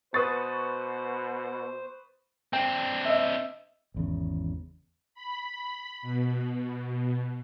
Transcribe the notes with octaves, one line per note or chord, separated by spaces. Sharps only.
B2 B4 C5 C#6 D#6 A6
C4 D4 G5
D#5 E5
G#1 E2 C#3
B5
B2